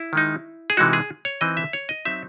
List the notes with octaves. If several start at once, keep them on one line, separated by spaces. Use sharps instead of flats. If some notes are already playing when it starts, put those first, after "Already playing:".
Already playing: E4
D#3 G#3 D#4
G#4
C3 E3 G#3 D#4 F#4
G#4
C#5
E3 C4 D#4 D#5
E5
C#5
D#5
F#3 C4 D#4 E5